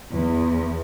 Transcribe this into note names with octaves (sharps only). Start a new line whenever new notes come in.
E2